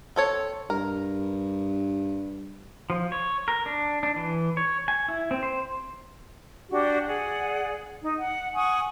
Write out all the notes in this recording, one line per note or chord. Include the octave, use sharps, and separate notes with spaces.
C4 A4 C#5
G2 A#4
F3
C#5
A#4
D4
D4
E3
C#5
G#5
E4
C4
C5
D4 F#4 G4
G#4 D5 F#5
D#4
F#5
F#5 G#5 C#6 D#6